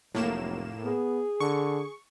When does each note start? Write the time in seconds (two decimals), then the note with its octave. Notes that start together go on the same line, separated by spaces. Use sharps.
0.15 F1 A2 F#3 A#3 E7
0.84 B3 G#4
1.40 D3 C#6